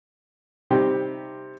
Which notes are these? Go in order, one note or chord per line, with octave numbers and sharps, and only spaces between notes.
C3 G3 C4 D#4 G4